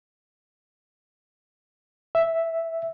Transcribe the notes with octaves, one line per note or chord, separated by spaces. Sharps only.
E5